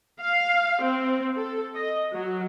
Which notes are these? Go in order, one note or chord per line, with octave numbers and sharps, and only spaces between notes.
F5
C4
A4
D#5
F#3